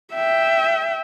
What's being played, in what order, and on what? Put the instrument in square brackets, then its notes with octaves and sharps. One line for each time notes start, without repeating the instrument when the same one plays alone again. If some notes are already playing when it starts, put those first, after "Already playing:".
[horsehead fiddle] E5 G5